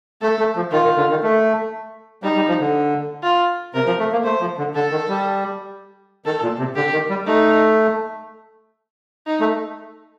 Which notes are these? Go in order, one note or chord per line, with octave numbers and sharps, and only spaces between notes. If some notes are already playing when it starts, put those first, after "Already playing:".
A3 A4
A3
F3
D#3 F4
D#3
D3
D#3
A3
G3 D#4
G3
F3
D3
F4
C3 A#4
F3
A3
A#3
A3 C5
F3
D3
D3 A4
D#3
G3
D#3 A4
A#2
C3
D3 G4
D#3
G3
A3 D#4
D#4
A3